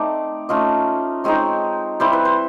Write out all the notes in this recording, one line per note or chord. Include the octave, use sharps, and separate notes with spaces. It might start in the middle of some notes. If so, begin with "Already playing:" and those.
Already playing: A3 C4 D#4 D5
A3 C#4 F4 D#5
G#3 C4 D#4 C#5
G3 C4 E4 C5
B4
C5